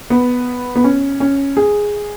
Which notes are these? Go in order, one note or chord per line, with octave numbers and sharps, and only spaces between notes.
B3
B3
C#4
C#4
G#4